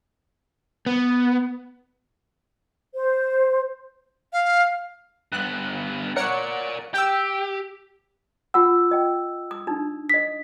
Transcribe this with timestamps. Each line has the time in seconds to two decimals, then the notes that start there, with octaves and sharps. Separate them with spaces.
0.86 B3
2.94 C5
4.33 F5
5.32 G2 B3 F#6
6.16 A#4 C#5 D5 F#5 C#7
6.94 G4 G5 E6
8.54 F4 F#5 E6
8.91 D#5 G5
9.51 D#6
9.67 D4 D#4
10.09 D#5 D#6 B6